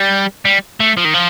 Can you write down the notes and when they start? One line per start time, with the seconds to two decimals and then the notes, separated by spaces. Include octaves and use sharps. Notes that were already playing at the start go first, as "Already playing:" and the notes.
Already playing: G3
0.45 G3
0.80 A3
0.97 F3
1.05 D#3
1.14 F3